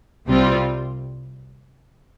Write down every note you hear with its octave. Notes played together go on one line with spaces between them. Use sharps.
C2 C3 G3 C4 F4